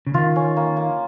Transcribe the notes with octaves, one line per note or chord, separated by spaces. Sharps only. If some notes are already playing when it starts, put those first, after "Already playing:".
C#3
D#3 F4
C#4
A#3
A#3